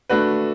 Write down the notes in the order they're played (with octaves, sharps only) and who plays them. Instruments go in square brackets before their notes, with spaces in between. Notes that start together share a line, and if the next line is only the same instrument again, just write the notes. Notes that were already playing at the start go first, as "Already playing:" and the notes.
[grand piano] A3 D4 F#4 B4